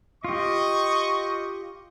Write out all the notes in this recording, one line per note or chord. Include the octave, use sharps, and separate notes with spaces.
F4 G4 D#5 C#6